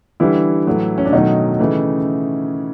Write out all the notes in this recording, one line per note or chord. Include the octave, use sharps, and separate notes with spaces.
D3 E3 G3 E4
A2 F#3 A3
C#4
D4
B2 D#3 F#3 A3 D#4
C#3 E3 A3